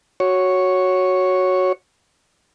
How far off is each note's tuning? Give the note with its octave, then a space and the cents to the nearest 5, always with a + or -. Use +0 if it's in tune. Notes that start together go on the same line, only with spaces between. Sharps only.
F#4 +0 C#5 +0